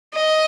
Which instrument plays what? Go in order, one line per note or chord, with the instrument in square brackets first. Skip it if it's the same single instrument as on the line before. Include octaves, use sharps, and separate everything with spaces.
[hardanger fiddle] D#5